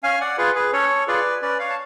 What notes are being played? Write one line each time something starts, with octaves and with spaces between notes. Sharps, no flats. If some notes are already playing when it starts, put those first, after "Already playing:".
C#4 F5 G#5
D5 F#5
F4 G#4 B4
G#4 B4
C#4 A4 C#5
F4 G#4 B4 D5
C#4 B4 D5
C#5 F5
A5